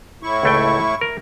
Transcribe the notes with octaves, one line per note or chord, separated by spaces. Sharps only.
A2 E4 C#6
C#2 A3 G5
A#4